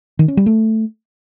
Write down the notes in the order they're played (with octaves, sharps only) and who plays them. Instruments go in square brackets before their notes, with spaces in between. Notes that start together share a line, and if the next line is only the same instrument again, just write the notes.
[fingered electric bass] D#3
C#4
G3
A3